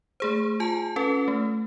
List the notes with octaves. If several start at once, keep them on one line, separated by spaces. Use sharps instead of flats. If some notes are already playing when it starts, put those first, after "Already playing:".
A3 G#4 C5
F4 G#5 A5
C#4 A4 B4
A3